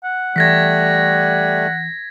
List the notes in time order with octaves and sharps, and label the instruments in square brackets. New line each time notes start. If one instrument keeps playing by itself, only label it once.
[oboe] F#5
[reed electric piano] E3 F#6 [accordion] G3 A3 [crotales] G#6 A#6 B6